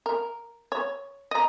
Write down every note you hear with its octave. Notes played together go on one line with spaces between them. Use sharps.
A#4
C#5
D#5 A#5